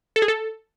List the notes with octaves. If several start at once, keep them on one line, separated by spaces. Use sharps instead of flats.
A4
G#4
A4